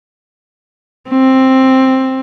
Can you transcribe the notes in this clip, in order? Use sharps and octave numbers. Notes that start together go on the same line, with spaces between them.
C4